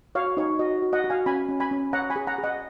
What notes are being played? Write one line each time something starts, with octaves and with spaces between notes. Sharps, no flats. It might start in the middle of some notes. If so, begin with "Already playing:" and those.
F#4 C#5 F5
D#4 C#5
F#4 D#5
F#4
D#5 F#5
F#4
F5 G#5
C#4 G#5 B5
C#4
G#5 B5
C#4
C#5 F#5 A#5
G#5 B5
G#4
F#5 A#5
G#4
D#5 F#5